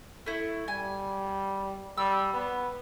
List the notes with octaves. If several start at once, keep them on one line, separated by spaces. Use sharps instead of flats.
A3 E4
G3 G#5
G3 E6
B3